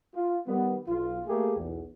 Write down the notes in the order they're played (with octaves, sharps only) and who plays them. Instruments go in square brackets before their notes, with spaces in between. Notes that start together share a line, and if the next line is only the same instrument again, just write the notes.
[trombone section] F4
D#3 G3 B3
B1 F4
A3 A#3 G4 G#4
B1 E2